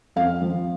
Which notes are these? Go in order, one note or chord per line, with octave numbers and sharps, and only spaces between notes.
F2 F5
F3